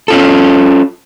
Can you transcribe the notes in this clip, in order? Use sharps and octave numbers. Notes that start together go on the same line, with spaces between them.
C#4 F4 A4